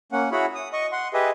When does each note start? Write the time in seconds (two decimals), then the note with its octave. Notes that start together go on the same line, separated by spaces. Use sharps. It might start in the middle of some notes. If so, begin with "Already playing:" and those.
0.12 A#3 C#4 F#5
0.32 E4 F#4 G#4 C#5 F#5 B5
0.55 D#6
0.73 D#5 C#6
0.92 F#5 C6
1.14 G4 G#4 B4 D#5 E5